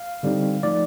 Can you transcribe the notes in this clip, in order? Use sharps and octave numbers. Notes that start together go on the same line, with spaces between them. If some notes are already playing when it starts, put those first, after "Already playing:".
Already playing: F5
D3 G3 C4 D#4
F3 A3 D#4 D5